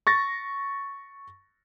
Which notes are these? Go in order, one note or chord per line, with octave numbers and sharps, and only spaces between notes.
C#6 A6 A#6